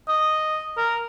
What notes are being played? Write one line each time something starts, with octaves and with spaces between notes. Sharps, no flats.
D#5
A#4